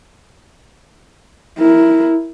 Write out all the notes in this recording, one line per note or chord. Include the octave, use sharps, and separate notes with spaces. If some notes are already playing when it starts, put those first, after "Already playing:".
E4 A#4